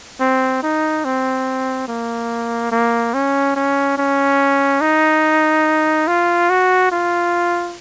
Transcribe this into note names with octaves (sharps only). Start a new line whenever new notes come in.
C4
D#4
C4
A#3
A#3
C#4
C#4
C#4
D#4
F4
F#4
F4